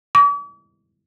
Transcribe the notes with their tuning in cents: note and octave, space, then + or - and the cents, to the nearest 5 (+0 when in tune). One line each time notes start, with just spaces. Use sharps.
D6 -45